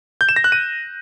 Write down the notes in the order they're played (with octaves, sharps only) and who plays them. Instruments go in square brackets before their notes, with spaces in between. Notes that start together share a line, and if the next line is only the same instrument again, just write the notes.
[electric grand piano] G6
E7
A#6
F#6
D#7